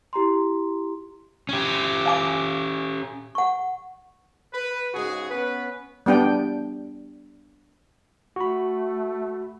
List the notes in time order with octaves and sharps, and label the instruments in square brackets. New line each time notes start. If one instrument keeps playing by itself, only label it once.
[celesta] E4 G4 A#5 C6
[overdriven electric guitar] C#4 G4
[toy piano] F5 G#5 D6
F#5 C#6
[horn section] B4
G#2 C#3 G#3 F#4 G#4
B3 C#4 B4
[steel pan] G3 B3 D4 G5
[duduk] A3 [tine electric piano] F#4 B5